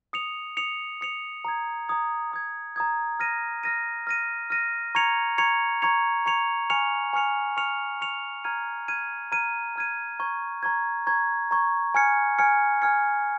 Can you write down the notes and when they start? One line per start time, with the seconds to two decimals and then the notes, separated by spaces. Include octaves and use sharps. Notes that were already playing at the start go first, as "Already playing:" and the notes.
0.13 D#6 C#7 F7
0.57 D#6 C#7 F7
1.01 D#6 C#7 F7
1.45 A#5 D#6 G#6
1.89 A#5 D#6 G#6
2.32 A#5 D#6 G#6
2.76 A#5 D#6 G#6
3.20 F6 A#6 D#7
3.64 F6 A#6 D#7
4.07 F6 A#6 D#7
4.50 F6 A#6 D#7
4.95 A#5 C#6 G#6 C#7 F7
5.38 A#5 C#6 G#6 C#7 F7
5.82 A#5 C#6 G#6 C#7 F7
6.26 A#5 C#6 G#6 C#7 F7
6.70 G#5 C#6 F6 C#7 F7
7.13 G#5 C#6 F6 C#7 F7
7.57 G#5 C#6 F6 C#7 F7
8.00 G#5 C#6 F6 C#7 F7
8.44 A#5 F6 G#6 D#7
8.88 A#5 F6 G#6 D#7
9.32 A#5 F6 G#6 D#7
9.76 A#5 F6 G#6 D#7
10.20 A#5 C#6 G#6
10.63 A#5 C#6 G#6
11.07 A#5 C#6 G#6
11.51 A#5 C#6 G#6
11.95 G#5 F6 G#6 C#7
12.39 G#5 F6 G#6 C#7
12.82 G#5 F6 G#6 C#7